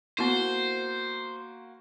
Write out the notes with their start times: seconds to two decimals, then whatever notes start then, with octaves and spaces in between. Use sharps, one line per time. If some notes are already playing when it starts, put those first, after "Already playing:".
0.18 A#3 B3 E4 F#4 C5